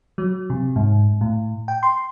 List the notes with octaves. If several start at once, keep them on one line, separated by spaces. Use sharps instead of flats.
F#3
C3
G#2
A2
G5
C6